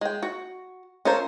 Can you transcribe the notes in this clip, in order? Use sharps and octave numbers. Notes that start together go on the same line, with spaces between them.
G#3 G5
F#4
C#4 F4 A4 A#4 C5